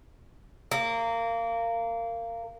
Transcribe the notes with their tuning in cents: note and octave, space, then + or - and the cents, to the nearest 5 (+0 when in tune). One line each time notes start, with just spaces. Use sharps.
A#3 -20